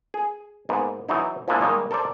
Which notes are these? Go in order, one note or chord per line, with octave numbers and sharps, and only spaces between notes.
G#4
G#2 A#3 B3
E3 F#3 D#4 E4
F3 G#3 A#3 D4 E4
D#3 G3 G#3 A#3 D#5
A4 A#4 C5 D5